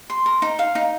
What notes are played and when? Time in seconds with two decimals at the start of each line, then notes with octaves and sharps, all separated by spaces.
0.10 C6
0.26 A#4
0.42 D#4
0.59 F5
0.75 D#4